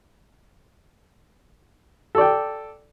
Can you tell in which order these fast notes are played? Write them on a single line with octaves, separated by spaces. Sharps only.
A4 D5 G5